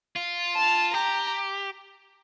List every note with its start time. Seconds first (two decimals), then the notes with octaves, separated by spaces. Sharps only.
0.16 F4
0.55 A5
0.93 G4 A#5